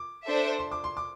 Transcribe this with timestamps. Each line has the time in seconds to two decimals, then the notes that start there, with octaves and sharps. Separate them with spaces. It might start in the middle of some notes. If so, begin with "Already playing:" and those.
Already playing: D6
0.24 D4 A4 C5 E5
0.59 C6
0.71 D6
0.84 C6
0.97 D6